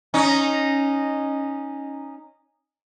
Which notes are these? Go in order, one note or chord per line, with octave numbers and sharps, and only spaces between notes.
C#4 D#4